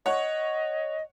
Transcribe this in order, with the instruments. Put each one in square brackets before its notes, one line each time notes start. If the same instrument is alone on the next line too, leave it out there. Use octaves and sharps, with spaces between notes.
[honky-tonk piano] C#5 F#5 [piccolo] D#5